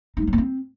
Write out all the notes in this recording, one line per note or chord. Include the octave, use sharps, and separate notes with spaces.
D#4
G3
F#3
B3
C4